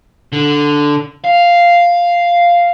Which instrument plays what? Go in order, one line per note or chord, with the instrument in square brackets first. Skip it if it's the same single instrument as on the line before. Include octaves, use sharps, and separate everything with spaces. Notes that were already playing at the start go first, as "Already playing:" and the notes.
[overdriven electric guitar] D3
F5